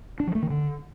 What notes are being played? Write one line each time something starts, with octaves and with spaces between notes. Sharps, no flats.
D4
F3
A3
D#3
D3